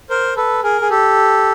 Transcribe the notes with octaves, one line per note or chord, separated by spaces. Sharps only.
A#4 C5
A4 B4
G#4 A#4
G#4
G4 A4